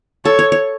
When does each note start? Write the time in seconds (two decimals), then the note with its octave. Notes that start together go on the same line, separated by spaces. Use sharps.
0.25 A4 C#5
0.39 C#5
0.52 C#5